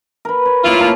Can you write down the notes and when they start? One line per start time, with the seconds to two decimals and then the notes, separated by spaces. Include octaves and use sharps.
0.25 A#4 B4
0.46 C#5
0.64 F#2 A2 A#3 E4 F4
0.80 C#4 A#4 A5